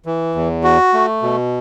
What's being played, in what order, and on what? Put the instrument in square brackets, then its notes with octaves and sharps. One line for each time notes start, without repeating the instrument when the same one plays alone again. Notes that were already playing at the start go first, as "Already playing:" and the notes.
[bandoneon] E3
E2
F#4
A3
B2